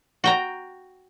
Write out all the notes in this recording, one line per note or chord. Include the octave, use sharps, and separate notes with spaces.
F#4 G5 A#5